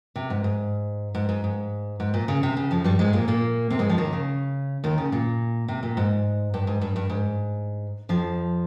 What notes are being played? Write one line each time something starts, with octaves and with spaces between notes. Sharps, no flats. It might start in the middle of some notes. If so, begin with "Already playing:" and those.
C3
G#2
G#2
G#2
G#2
G#2
G#2
A#2
C#3
C3
C#3
F2 F3
G2 G3
G#2 G#3
A#2 A#3
A#2 A#3
C3 C4
G#2 G#3
F2 F3
D#2 D#3
C#3
D#2 D#3
C#3
A#2
C3
A#2
G#2
G2
G#2
G2
G2
G#2
F2 F3